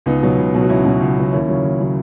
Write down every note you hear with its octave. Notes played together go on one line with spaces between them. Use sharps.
C#2 B3 D#4
B2 F#3
C#2
B2 F#3
F#4
C#2 C#4 E4
B2 F#3
C#2
B2 F#3
D#2 C#4 E4
C#3 F#3
D#2
C#3 F#3